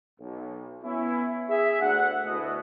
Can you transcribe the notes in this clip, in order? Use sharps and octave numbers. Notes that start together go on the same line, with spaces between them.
B1
B3 C#4 E4
G#4 E5
D2 F#5
D2 B2 E4 D#5